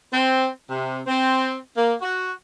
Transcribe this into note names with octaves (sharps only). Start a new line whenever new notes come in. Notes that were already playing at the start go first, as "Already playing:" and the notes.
C4
C3
C4
A#3
F#4